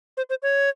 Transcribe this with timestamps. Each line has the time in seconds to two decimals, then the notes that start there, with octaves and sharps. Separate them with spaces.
0.17 C5
0.30 C5
0.43 C#5